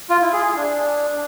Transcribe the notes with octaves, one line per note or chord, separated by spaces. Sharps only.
F4
E4
G#4
G#4
D4